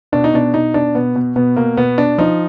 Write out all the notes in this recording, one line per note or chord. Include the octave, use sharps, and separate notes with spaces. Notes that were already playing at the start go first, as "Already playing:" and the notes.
B2 D4
D#4
B2 D4
B2 D#4
B2 D4
B2 B3
B2
B2 B3
B2 A#3
B2 B3
B2 D4
F3 D#4